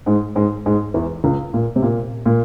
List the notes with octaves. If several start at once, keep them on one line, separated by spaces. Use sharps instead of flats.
G#2 G#3
G#2 G#3
G#2 G#3
E2 E3
C#2 C#3
A#2
C3
A#2
A#2